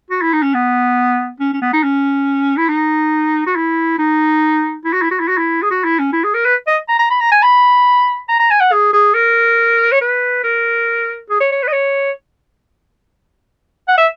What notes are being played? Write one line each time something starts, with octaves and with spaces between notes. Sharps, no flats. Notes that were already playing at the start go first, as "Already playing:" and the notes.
F#4
E4
D#4
C#4
B3
C#4
C#4
B3
D#4
C#4
E4
D#4
F#4
E4
D#4
E4
F#4
E4
F#4
E4
F#4
E4
G#4
F#4
E4
C#4
E4
G#4
A#4
B4
D#5
A#5
A#5
B5
A#5
G#5
B5
A#5
A#5
G#5
F#5
G#4
G#4
A#4
C#5
B4
A#4
G#4
C#5
C#5
B4
D#5
C#5
F#5
E5